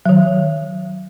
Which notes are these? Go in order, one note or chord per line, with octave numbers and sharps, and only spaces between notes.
D#3 F#3